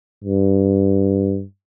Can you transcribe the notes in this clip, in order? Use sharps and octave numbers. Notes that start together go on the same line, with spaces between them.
G2